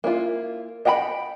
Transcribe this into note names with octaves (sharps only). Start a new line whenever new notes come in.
A#3 E4 F4
D#5 F#5 G5 A#5 B5